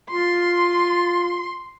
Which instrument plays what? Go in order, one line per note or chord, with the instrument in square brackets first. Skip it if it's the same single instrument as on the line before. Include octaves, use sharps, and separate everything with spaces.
[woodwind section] F4 [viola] C6